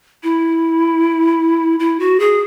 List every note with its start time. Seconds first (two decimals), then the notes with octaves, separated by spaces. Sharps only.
0.23 E4
1.79 E4
2.00 F#4
2.20 G#4